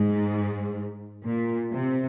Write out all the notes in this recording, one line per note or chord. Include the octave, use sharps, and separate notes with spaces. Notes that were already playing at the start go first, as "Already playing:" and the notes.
Already playing: G#2
A#2
C3